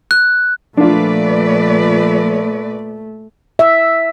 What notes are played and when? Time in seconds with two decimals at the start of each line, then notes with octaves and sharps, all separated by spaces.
0.11 F#6
0.77 A#2 F3 A3 D4 F4 B4 D5
3.59 E5